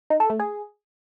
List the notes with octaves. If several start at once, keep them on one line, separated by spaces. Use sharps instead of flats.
D#4
A4
A3
G#4